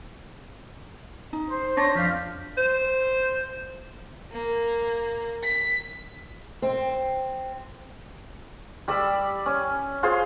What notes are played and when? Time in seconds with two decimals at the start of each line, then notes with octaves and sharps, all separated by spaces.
1.33 D#4
1.47 C5
1.77 D4 C#5 A#6
1.95 F2 D5 F5 F6 G6 B6
2.57 C5
4.32 A#3
5.43 B6
6.62 C4
8.88 G3 D5 B5 E6
9.46 C#4
10.03 F4 G#4 C5 C6